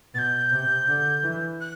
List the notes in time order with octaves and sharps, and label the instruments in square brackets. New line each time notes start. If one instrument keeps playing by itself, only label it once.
[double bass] B2 [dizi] A6
[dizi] G6
[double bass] C3
D3
E3
[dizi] F#6